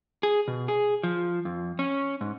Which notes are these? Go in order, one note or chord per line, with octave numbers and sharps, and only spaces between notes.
G#4
B2
G#4
F3
F2
C#4
G#2